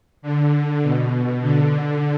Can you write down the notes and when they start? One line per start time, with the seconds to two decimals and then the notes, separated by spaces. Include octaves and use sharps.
0.22 D3
0.53 D3
0.83 B2
1.42 D3